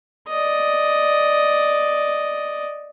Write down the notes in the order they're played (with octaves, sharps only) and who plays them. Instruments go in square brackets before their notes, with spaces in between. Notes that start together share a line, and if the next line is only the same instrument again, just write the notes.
[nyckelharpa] D5 D#5